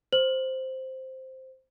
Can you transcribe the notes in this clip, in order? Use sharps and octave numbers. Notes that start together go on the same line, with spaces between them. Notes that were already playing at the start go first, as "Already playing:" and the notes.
C5 F#7